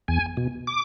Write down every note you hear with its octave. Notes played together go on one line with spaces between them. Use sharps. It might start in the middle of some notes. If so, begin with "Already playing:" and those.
E2 G#5
B2
D6